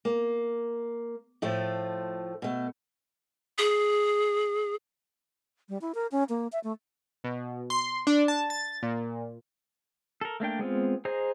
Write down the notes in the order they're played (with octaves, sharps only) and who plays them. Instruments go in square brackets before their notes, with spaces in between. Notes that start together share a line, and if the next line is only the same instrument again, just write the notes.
[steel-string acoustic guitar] A#3
A2 F3 A3 F4
B2 A3
[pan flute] G#4
[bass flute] G3
E4
A#4
C#4
A#3
E5
A3
[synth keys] B2
C6
D4
A5
A6
A#2
[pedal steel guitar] A4 A#4
A3 A#3 D4 G5
G#3 B3 C4 F4
G#4 C5 D#5 A#5